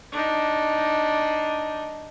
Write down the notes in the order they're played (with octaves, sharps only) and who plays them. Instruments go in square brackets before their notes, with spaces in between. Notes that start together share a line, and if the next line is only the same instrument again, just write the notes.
[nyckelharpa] D4 D#4